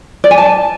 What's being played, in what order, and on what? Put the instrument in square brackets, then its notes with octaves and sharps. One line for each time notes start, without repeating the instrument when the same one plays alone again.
[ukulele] D5
G#5
A5